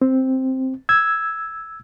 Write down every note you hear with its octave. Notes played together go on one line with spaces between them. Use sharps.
C4
E6 G#6